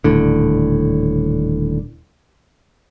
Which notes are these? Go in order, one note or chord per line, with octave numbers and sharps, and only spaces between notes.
D#1 A2 D3